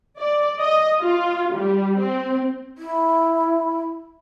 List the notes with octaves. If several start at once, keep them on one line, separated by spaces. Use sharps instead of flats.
D5
D#5
F4
G3
C4
E4